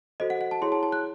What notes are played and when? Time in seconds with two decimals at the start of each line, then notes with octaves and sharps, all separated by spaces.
0.20 F#4 A4 C5 D#5
0.30 F#5
0.41 F#5
0.51 A5
0.61 E4 G#4 C#5 C6
0.72 A5
0.83 A5
0.92 F#6